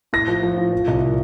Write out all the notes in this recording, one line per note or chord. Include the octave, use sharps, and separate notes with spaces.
A2 A#6
F3
F3
A2
F3
C2
A#2